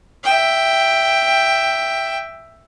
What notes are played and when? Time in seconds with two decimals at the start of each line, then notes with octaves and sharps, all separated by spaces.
0.24 E5 G5